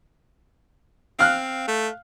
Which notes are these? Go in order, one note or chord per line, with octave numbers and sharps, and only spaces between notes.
C4 F5 F6 F#6
A3